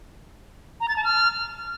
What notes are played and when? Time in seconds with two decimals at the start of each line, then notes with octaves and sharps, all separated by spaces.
0.80 A#5
0.88 A6
0.96 A5
1.04 F6